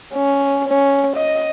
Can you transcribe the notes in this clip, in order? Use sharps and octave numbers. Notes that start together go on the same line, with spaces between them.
C#4
C#4
D#5